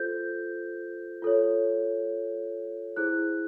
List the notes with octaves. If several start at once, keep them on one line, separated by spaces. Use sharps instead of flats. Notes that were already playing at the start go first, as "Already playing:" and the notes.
Already playing: F4 A4 C5 G6
F4 A4 C#5
E4 G#4 C5 F#6